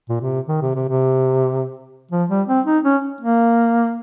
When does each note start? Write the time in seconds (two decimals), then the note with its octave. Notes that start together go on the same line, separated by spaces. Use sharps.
0.09 A#2
0.21 C3
0.48 D#3
0.62 C3
0.75 C3
0.89 C3
2.11 F3
2.29 G3
2.48 C4
2.66 D#4
2.84 C#4
3.21 A#3